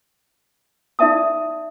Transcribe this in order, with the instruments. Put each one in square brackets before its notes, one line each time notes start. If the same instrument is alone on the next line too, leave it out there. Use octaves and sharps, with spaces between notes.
[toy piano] D#4 D5 E5 A5 D#6